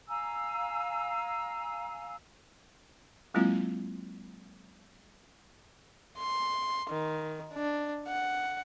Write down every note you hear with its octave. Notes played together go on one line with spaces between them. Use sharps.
F5 G#5 A#5 E6
F#3 G#3 A#3 C4 E4 F4
C6
D#3
D4
F#5